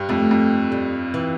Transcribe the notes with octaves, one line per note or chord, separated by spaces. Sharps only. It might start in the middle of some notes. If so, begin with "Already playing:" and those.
Already playing: G2
F2 A3
F2
G3
E3